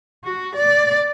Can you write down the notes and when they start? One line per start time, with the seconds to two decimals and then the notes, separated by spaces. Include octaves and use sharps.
0.25 F#4
0.56 D5